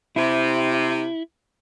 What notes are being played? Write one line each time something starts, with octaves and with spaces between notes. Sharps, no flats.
C3 E4